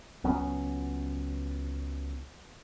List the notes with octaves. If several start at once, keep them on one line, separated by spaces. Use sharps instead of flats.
C#2 F#3 B3 C#4